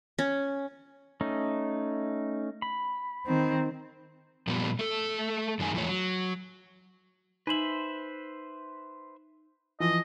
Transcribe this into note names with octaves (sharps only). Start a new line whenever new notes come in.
C#4
A3 C#4 D#4
B5
D#3 C4
A#2 F3 G3 B3
A3 A4
F#2 D#3 G#3 G#5
E2 F3 A3 C#5
F#3
D#4 B4 C5 E5 F#7
E3 F3 D#5